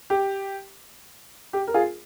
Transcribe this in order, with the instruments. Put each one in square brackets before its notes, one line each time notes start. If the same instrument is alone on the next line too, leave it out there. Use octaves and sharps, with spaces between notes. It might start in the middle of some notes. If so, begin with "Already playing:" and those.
[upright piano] G4
G4
A#4
F4 G#4